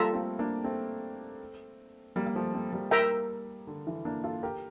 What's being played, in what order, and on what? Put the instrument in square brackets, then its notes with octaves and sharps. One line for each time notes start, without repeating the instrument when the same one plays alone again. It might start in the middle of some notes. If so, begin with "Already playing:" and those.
Already playing: [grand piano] G3 A#3 [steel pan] F4 A4 E5 A#5
[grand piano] A3 C4
A#3 D4
A3 C4
G3 A#3
A#3
F3 A3
A3 C4
G3 A#3
[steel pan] A#4 E5 G5 A#5
[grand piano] D3
E3
A#3 D4
F4 A4
G4 A#4